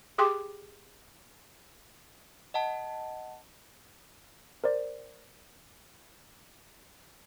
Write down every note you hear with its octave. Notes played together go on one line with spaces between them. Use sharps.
G4 G#4 G5 C6 D6
D#5 F#5 A5
A#4 C5 D5